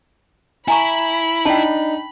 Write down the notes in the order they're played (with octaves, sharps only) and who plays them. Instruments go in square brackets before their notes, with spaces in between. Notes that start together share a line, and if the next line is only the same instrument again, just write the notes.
[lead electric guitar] E4 [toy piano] G#5 A#5 C#6 [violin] B5
[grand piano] D4 D#4 [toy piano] G5 A5